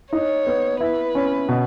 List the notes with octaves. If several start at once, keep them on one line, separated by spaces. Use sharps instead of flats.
D#4 C#5
B3
E4 B4
C#4
B2